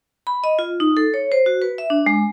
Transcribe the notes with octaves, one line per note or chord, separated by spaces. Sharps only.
B5
D#5
F4
D#4
A4
C#5
C5
F#4
B4
E5
D4
G#3